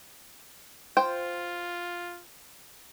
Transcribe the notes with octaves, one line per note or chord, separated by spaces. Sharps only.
F4 C5 G5